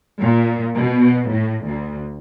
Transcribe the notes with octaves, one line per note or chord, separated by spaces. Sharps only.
A#2
B2
A2
D2